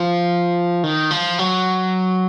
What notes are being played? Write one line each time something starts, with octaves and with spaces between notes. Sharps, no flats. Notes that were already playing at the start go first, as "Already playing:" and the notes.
Already playing: F3
D#3
F3
F#3